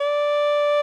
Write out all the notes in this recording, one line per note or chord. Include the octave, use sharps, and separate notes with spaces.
D5